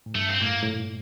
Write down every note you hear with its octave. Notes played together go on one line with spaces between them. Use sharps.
A2
G2 A3
C4
A2 A#3
A2
A#2